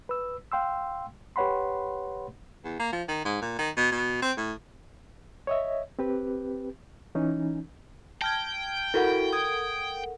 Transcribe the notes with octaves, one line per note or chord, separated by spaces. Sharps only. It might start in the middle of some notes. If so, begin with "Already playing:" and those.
B4 E6
F5 G5 C6 E6
G4 B4 C#5 F#5 B5 C6
E2
A#3
F3
D#3
G#2
A#2
D#3
B2
B2
C4
A2
C#5 D#5 E5
C4 G4 B4
E3 C#4 D#4
G5 A5 F6 G#6
E4 F#4 A4 A#4 F#5
D#6 G#6